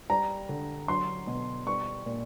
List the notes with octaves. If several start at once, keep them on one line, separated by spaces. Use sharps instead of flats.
G3 A#5
D3
F#3 C6
B2
G3 C#6
A#2